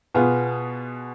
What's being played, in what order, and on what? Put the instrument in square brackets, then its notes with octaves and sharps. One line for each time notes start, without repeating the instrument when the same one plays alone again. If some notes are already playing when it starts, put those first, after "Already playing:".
[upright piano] B2 B3 F4 G#4